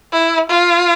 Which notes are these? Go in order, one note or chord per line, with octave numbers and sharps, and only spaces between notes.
E4
F4